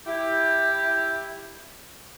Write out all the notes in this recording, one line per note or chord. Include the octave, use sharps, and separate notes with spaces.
E4 G4